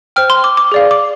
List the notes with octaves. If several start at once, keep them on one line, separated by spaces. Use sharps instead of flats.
C5 G5 F6
C6
D6
D6
G#4 D5 F5
D6